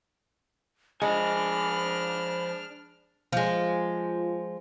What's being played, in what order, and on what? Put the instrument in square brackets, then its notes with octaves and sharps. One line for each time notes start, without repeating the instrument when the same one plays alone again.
[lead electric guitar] F3 G#5 [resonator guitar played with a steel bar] G#3 [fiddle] D4 F6 [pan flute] B5
[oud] F3 G#3